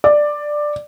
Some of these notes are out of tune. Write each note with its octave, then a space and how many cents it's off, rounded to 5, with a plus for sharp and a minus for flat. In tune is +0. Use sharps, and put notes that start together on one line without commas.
D5 +10